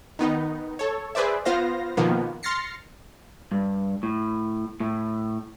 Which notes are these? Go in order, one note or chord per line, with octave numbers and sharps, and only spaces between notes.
D#3 B3 D#4
A4 C#5
G#4 B4 C5 D5 E5
B3 F4 C5 F5 A#6
B2 D#3 F3 A#3 B3
C6 F6 A6 A#6 C7 C#7
G2
A2
A2